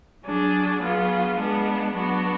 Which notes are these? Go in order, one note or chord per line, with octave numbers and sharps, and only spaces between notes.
F#3 D4 G#4
F#3 B3 F4 G#4
G#3 B3 D4 G#4
F#3 B3 D4 F#4